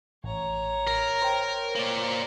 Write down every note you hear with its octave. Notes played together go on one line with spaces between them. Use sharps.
A1 C#5 A#5
A#4
C5 G5
A#3 C#5 D5